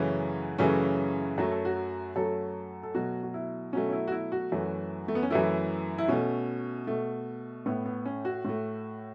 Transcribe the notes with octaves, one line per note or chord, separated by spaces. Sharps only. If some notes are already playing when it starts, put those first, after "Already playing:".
Already playing: F#2 C#3 E3 A3 C#4
F#2 C#3 E3 A3 C#4
F#2 F#3 A3 F#4
A4
F#4
F#2 F#3 A3 A4
A4
B2 F#3 A3 F#4
F#4
E4
B2 F#3 A3 C#4
C#4
E4
F#4
E4
F#4
F#2 E3 A3
A3
B3
C#4
F#2 E3 A3 E4
E4
B2 A3 C#4
B2 A3
A2 A3 B3
B3
C#4
F#4
A2 A3